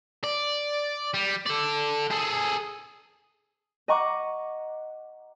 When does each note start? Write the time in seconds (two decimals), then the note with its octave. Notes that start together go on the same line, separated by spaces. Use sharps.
0.24 D5
1.14 G3
1.46 A4 D5
2.11 G#4 A4
3.88 D#5 F#5 A#5 C#6 D6